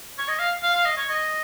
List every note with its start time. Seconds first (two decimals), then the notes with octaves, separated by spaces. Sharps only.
0.18 C#5
0.28 D#5
0.39 F5
0.63 F5
0.74 F5
0.86 D#5
0.97 C#5
1.09 D#5